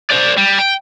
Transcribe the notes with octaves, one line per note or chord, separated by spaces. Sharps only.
C5 D5
G3
G5